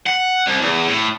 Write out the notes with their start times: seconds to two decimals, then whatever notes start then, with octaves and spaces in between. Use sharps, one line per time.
0.06 F#5
0.47 C2
0.61 E2
0.88 A2